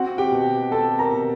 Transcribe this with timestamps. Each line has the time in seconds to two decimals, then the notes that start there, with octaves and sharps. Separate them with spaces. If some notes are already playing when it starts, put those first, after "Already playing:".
Already playing: C4 F#4 F#5
0.18 G4 G5
0.32 B2
0.72 C4 A4 A5
0.99 A#4 A#5
1.12 B2